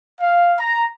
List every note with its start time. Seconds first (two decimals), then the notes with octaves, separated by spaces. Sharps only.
0.21 F5
0.59 A#5